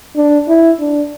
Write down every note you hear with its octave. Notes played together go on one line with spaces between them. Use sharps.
D4
E4
D4